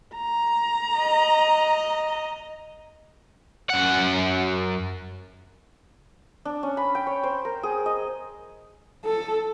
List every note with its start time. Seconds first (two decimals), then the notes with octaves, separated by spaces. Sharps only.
0.16 A#5
0.97 D#5
3.70 F#2 F#5
6.45 D4
6.63 C#4
6.77 B5
6.95 G5
7.07 C#5
7.23 C5
7.45 A#4
7.63 G#4
7.86 D#5
9.05 A4